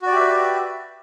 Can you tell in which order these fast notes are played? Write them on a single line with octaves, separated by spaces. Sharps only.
F#4 D5 G4 E5 B4